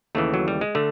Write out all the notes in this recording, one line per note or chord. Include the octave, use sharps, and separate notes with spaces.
D#2 C#3 E3 A3
F#3
G3
G#3
D3 A3